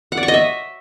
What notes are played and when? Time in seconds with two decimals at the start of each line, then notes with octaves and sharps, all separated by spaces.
0.12 F#5
0.17 D5
0.23 C#6
0.28 D#5
0.34 E5